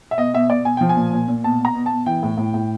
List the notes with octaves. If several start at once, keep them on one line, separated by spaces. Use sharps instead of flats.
E5
B2 D#5
B2 E5
B2 D5
B2 G#5
F3 G5
G#5
A#2
A#2
A#2
B2 A5
B2
A#5
B2
B2 A5
E3 G5
A2
A2
A2